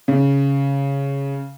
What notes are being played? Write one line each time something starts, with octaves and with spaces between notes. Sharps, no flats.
C#3